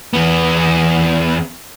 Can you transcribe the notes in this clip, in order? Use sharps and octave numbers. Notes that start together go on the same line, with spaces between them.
E2 B3